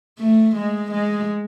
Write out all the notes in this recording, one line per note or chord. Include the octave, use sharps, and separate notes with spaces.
A3
G#3
G#3